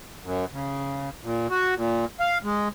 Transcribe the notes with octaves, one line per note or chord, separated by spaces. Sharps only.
F#2
C#3
A#2
F#4
A#2
F5
G#3